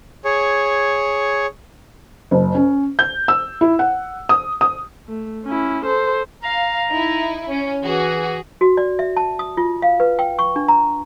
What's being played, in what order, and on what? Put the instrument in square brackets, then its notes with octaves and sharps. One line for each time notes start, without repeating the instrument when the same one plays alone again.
[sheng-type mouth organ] G#4 C#5
[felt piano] F#1
C#4
G6
E6
E4
F#5
D#6
D#6
[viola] A3
C#4 E4
A4 C5
[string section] F5 [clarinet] A#5
[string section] D#4 E4
[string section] C#4 [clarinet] C#5
[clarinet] E3 [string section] F#4 G#4
[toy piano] F#4
D5
E5
A5
D#6
F4
F5
B4
G5
C#6
D4
A#5